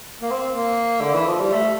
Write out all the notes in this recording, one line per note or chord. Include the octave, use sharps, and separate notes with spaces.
A#3
C4
A#3
D3
E3
F3
G3
A3